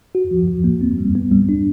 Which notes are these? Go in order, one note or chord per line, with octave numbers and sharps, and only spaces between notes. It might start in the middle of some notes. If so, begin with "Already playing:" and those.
F#4
F3
F3
A#3
C4
G3
B3
G3
D4